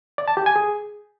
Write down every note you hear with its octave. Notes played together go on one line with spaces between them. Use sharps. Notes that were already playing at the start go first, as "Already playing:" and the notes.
D5
A5
G4
G#5
G#4